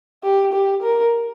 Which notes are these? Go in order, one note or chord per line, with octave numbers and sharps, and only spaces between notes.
G4
G4
A#4